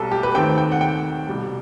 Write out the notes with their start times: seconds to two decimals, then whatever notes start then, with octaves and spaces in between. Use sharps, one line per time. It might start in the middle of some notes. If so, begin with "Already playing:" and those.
Already playing: B1 B2 G3 C4 A4
0.11 G4
0.23 B4
0.35 D#2 D#3 A3 C4 G5
0.58 G5
0.72 F#5
0.81 G5
1.27 C2 B2 G3